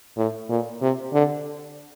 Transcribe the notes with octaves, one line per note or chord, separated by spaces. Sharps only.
A2
A#2
C3
D3